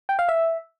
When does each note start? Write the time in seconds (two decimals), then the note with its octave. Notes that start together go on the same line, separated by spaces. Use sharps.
0.09 G5
0.19 F5
0.29 E5